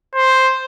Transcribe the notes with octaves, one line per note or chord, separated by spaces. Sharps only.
C5